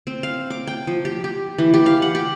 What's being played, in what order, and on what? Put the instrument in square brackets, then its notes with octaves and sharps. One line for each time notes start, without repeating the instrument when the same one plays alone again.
[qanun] C4
F5
D6
G5
F3
G4
G4
E3
G4
F5
F#5
G4